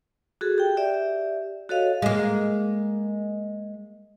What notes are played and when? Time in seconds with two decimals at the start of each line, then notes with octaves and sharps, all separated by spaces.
0.41 F#4 G#4 A4
0.58 G4 G5
0.77 G4 D5 E5
1.69 F#4 A4 C#5 D#5 F5
2.02 G#3 A#3